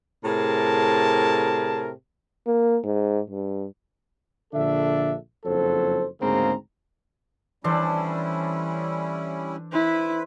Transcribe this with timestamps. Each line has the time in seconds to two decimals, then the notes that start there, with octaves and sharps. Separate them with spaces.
0.25 A2 C3 G#4 A#4 A5
2.47 A#3
2.84 G#2
3.30 G2
4.54 A#1 D3 D4 A4 E5
5.45 F#1 F2 F#3 A4 C5
6.21 D2 G#2 C#3 A#3 C4 A#5
7.64 E3 G3 C#4 D4 E4 A4 C5
9.73 E4 B4 C5